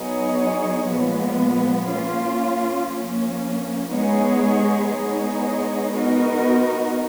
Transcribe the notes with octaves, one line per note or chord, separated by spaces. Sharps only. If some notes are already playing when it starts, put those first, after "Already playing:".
Already playing: F#3 B3 D#4 G#4 C#5
A#2 F3 G#3 B3
A#3 C#4 F4
F3 A#3 C#4
G#3 B3 D#4 G#4 C#5
G#3 B3 D#4 G#4 C#5
B3 D#4 F#4 A#4